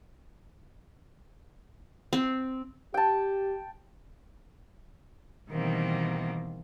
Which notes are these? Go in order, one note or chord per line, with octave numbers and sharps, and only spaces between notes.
C4
G4 G5 A5
B2 D#3 E3 G3 A#3 C4